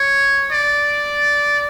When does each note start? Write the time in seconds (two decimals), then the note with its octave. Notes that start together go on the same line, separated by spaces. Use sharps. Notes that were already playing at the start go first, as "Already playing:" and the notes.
Already playing: C#5
0.52 D5